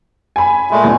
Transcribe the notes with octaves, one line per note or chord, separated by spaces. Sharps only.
G#5 B5
A#2 G#3 A3
A1 B2 G#5